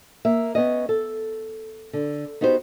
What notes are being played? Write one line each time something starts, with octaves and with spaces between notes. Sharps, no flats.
A#3 E5
B3 C#4 D#5
A4
D3
B3 D#4 F#4 G4 C5